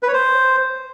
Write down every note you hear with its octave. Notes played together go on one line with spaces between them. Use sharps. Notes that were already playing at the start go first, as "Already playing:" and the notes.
B4
C#5
C5